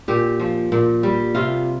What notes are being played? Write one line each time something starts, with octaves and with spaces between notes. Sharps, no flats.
A#2 G4
F3
A#2
G3
C3 F4